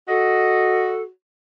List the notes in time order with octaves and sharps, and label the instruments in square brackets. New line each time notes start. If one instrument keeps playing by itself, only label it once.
[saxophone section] F#4 [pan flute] A4 [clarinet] D#5